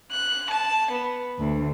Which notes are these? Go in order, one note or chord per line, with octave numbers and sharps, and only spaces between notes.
F#6
A5
B3
D2